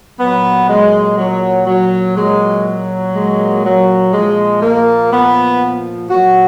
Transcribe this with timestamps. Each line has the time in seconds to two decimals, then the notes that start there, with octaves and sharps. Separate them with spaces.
0.19 A#2 F#3 B3
0.68 G#3
1.18 F#3
1.66 F#3
2.16 A#2 F#3 G#3
3.13 G#3
3.63 F#3
4.12 A#2 F3 G#3
4.61 A#3
5.11 B3
6.09 A#2 F#3 F#4